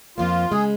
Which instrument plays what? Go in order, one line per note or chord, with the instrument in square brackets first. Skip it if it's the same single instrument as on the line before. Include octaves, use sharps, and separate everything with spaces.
[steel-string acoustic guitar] F2 F3 A#3 [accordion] F4
[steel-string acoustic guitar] C#3 G#3 [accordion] G#4